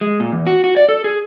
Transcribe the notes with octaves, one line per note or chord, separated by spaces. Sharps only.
G#3
A#2
E2
F#4
F#4
D5
A4
G#4